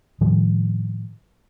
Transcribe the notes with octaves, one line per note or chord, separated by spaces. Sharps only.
A2 D#3 F3 G3